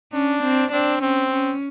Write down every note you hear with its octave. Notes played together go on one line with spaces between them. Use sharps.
C#4 D4
C4
C4 D4
C4 C#4
C#4